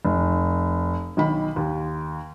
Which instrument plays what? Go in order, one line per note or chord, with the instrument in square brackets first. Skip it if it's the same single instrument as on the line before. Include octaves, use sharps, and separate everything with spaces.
[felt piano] F1
B1 D#3 B5
D#2